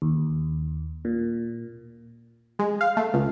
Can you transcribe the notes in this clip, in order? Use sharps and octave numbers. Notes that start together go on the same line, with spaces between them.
D#2
A#2
G#3
F5
A3
C#2